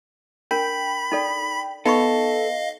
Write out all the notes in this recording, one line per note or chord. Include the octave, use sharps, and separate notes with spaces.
D4 A#4 G5 B5 B6
D#4 A4 D5
B3 D#4 A4 D#5 F5 B5 C#6